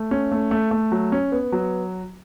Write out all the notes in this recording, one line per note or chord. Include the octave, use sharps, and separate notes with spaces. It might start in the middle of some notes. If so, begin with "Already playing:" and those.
Already playing: A3
C#4
A3
A3
A3
F#3
C#4
B3
F#3